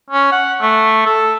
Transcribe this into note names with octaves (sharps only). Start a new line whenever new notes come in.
C#4
F#5
A3
A4